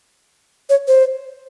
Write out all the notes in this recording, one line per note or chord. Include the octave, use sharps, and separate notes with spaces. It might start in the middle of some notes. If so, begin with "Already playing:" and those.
C#5
C5